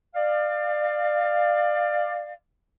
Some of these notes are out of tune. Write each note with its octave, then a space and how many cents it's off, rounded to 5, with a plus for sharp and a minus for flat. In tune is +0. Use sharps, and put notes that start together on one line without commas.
D5 +25 F5 +0